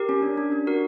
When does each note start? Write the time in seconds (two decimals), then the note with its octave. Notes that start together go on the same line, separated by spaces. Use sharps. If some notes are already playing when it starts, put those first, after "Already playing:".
Already playing: G4 A#4
0.09 C#4
0.23 D4
0.37 D4
0.52 D4
0.67 F#4 A#4